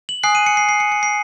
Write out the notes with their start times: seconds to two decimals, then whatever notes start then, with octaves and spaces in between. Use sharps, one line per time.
0.09 F#7
0.23 G#5 D#6 F#6 C7
0.35 D#7
0.46 C#7
0.57 C7
0.69 C7
0.80 C#7
0.92 C#7
1.03 C7